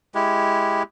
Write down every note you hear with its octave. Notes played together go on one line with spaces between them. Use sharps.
G#3 E4 G4